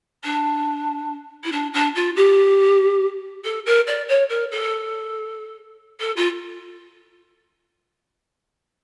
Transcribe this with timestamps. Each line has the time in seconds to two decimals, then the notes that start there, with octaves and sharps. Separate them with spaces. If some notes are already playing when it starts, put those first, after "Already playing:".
0.24 D4
1.44 E4
1.52 D4
1.73 D4
1.95 F4
2.16 G4
3.44 A4
3.66 A#4
3.87 D5
4.08 C#5
4.30 A#4
4.51 A4
6.00 A4
6.16 F4